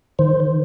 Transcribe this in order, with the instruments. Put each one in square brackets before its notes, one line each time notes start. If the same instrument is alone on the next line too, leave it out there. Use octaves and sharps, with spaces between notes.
[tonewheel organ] D#3 C5